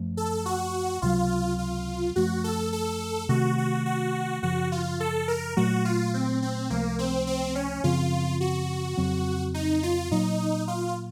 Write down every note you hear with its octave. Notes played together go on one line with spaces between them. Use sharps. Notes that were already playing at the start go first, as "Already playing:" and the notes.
Already playing: F#2 F3 A3
A4
F#4
C#2 C3 D#3 F#3 F4
F4
F#2 F3 A3 F#4
A4
A4
C3 D#3 A3 F#4
F#4
F#4
F#2 C#3 F3 F#4
F4
A4
A#4
A#2 F#3 A3 F#4
F4
C4
C4
C#2 C3 F3 A3 A#3
C4
C4
C#4
F#2 C#3 F3 C4 F4
F#4
F2 C#3 F#3 C4
D#4
F4
A#2 F#3 A#3 D#4
F4